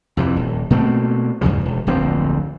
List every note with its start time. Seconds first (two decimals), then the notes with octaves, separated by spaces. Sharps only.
0.17 F2 C3 E3
0.36 D#1
0.70 B2 A3 A#3 C4
1.41 E2 G#2 C#3 F3
1.65 E1
1.87 D1 A#1 F2 C4